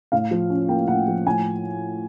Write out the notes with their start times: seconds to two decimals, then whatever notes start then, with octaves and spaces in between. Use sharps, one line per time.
0.12 A2 F5
0.31 F3
0.50 C#4
0.69 A#3 G5
0.88 A2 F#5
1.08 F3
1.26 A2 G#5